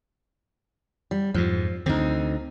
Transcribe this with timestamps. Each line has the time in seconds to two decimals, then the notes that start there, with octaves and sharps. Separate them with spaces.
1.11 G3
1.34 F2 G#2 F3
1.86 D2 D3 C4 D#4